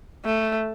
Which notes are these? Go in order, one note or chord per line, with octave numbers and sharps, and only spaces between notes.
A3